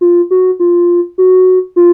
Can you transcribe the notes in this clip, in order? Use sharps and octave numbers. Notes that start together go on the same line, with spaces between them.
F4
F#4
F4
F#4
F4